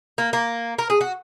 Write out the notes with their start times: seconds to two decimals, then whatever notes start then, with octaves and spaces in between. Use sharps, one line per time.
0.18 A#3
0.33 A#3
0.78 A#4
0.90 G#4
1.01 F#4